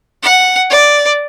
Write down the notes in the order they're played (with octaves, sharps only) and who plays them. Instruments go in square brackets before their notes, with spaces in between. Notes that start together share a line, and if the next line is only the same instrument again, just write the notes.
[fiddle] F#5
D5